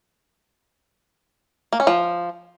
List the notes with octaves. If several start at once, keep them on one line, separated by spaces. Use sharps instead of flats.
A#3
C#4
F3